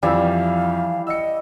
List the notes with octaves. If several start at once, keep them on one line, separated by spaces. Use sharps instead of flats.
F2 E3 G3 F5 E6
D#5 E6 C#7